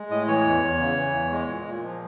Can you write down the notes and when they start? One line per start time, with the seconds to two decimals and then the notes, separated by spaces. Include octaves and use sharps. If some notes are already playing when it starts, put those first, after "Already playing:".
Already playing: G#3
0.10 A2 D#5
0.27 E3 C#5
0.46 E2
0.63 E2
0.80 C#3
0.97 E3
1.14 E2
1.32 G#3
1.49 A#2
1.66 A#2
1.84 F3